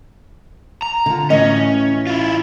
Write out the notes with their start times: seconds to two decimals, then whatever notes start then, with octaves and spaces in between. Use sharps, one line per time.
0.82 A#5
1.06 D3 F4
1.30 A2 E3 C#4 D#5
2.07 E4 F4